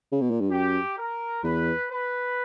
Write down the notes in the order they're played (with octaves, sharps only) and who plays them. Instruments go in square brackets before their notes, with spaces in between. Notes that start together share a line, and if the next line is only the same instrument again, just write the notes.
[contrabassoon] C#3
B2
A#2
G2
[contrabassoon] F#2 [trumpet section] G4
[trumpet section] A#4
[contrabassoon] E2 [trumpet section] B4
[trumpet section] B4